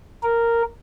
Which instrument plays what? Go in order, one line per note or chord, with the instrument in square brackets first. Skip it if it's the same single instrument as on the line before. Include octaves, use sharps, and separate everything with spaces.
[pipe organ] A#4